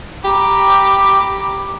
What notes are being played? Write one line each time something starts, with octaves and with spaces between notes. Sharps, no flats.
G4 A#5 B5 D6